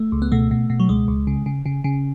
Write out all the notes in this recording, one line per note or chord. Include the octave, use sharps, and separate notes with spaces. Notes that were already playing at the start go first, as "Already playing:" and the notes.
Already playing: A3
C#2
B3
B2 A3
B2
B2
F#3
C#2 G#3
C#2
C#3
C#3
C#3
C#3